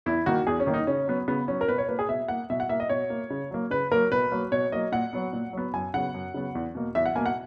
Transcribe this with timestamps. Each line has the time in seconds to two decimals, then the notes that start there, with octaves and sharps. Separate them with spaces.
0.06 E2 E4
0.26 D#3 A#3 F#4
0.47 E2 G#4
0.60 C#4
0.67 D#3 A#3
0.74 D#4
0.87 C#3 C#4
1.08 F#3 B3
1.28 C#3 B3
1.48 F#3 B3 C#4
1.61 A#4
1.68 B2 B4
1.78 C#5
1.89 A#3 B4
1.99 G#4
2.09 B2 E5
2.28 A#3 F#5
2.50 B2 E5
2.60 F#5
2.69 A#3 E5
2.80 D#5
2.89 B2 C#5
3.10 A#3
3.30 C#3
3.51 F#3 A#3
3.70 C#3 B4
3.91 F#3 A#3 A#4
4.12 B2 B4
4.32 F#3 A#3
4.52 B2 C#5
4.72 F#3 A#3 D#5
4.92 A#2 F#5
5.13 F#3 B3
5.33 A#2
5.53 F#3 B3
5.73 F#2 G#5
5.94 C#3 F#3 B3 F#5
6.14 F#2
6.34 C#3 F#3 B3
6.55 E2
6.75 B2 A#3
6.95 E2 E5
7.06 F#5
7.16 B2 A#3 G#5
7.26 F#5